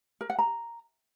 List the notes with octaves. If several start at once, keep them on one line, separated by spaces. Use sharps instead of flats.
A#4
F#5
A#5